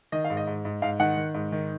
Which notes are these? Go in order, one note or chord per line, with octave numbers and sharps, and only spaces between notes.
D#3 D#5
F5
G#2
D#5
G#2
G#2
G#2 F5
D#3 F#5
D#3
G#2
D#3